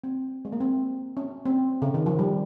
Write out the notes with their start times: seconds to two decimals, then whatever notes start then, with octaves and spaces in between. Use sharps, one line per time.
0.04 C4
0.45 G#3
0.52 A#3
0.60 C4
1.17 C#4
1.46 C4
1.82 C#3
1.94 D#3
2.06 F3
2.19 G3